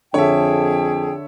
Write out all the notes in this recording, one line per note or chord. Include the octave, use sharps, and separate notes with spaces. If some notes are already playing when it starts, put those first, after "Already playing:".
F2 D3 G#4 C#5 E5 G5 A5